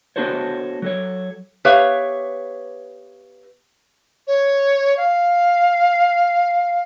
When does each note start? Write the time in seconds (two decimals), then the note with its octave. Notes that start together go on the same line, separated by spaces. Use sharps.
0.16 B3 D4 F#4 A4 C5 C#5
0.82 F#3 A4 C#5
1.65 B3 G4 B4 C#5 E5 F5
4.27 C#5
4.97 F5